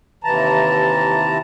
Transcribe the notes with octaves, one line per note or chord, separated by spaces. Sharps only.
D#2 C3 E3 A5 A#5